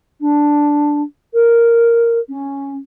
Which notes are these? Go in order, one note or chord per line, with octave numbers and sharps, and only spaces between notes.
D4
A#4
C#4